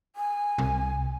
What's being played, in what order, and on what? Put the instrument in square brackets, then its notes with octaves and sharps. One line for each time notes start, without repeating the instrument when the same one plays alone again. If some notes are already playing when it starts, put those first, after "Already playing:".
[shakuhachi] G#5
[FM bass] C2